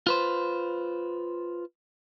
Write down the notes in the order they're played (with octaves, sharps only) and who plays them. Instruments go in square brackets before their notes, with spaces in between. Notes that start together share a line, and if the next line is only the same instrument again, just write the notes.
[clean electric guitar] F4 B4 C5